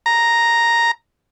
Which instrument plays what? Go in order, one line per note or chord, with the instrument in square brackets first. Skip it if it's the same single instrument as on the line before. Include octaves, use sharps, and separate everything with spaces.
[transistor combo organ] A#5